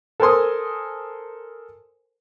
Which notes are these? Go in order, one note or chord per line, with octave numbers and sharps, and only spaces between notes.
A4 A#4 C5 G#5 C6 D#6